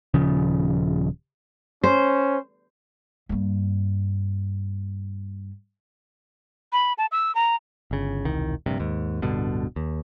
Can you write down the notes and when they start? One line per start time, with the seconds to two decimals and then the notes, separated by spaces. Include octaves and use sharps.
0.14 D#1 C#3 F3
1.84 C#4 C5
3.29 G2 A#3
6.73 B5
6.98 A5
7.12 E6
7.35 A#5
7.91 G1 C#3
8.25 E1 C2 D#3
8.66 A#1 G2 C3
8.79 D#2 G#2
9.22 D1 G2 B2 D3
9.76 D#2